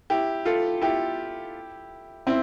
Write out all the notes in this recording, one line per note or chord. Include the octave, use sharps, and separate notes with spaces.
E4 G4
F4 A4
E4 G4
C4 E4